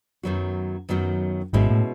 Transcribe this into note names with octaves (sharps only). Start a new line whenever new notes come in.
F#2 D#3 F#3 B3 F#4
F#2 D#3 F#3 B3 F#4
G#1 G#2 B2 G#3 C#4 E4
A2